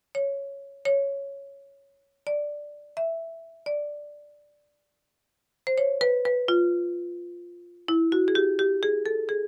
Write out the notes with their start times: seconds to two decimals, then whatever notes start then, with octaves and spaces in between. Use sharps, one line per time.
0.15 C#5
0.85 C#5
2.27 D5
2.97 E5
3.66 D5
5.67 C5
5.78 C#5
6.01 B4
6.25 B4
6.48 F4
7.88 E4
8.12 F#4
8.28 G#4
8.35 G4
8.59 G4
8.83 G#4
9.06 A4
9.29 G#4